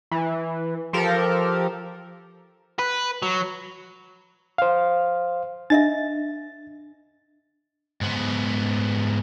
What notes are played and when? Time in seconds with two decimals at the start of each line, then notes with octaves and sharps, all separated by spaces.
0.11 E3
0.93 F3 G4 A4 A#4
2.79 B4
3.22 F#3
4.58 C5 F5
5.70 D4 D#5 E5 A6
8.01 G#2 B3